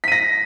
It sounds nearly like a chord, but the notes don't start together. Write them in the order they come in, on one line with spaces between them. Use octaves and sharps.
B6 D#7 A#6